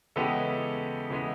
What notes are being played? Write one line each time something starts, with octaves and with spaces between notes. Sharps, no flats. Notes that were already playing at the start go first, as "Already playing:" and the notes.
C#3 E3 G#3 B3 G4 A4
C#3 E3 G#3 B3